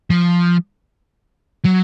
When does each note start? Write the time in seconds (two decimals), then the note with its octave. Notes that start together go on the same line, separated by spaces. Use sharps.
0.10 F3
1.64 F#3